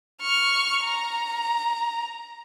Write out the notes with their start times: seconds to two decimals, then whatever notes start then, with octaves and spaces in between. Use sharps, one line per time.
0.21 C#6 F6
0.84 A#5